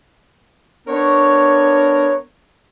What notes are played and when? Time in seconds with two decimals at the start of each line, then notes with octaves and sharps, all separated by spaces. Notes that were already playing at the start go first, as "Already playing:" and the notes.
0.88 B3 D4 A#4 C#5